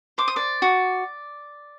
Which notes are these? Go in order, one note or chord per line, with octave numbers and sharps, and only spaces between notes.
C5 D6
D#6
D5 D6
F#4